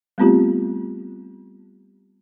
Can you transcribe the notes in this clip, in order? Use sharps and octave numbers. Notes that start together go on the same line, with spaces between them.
G3 A3 B3 C4 F4 G4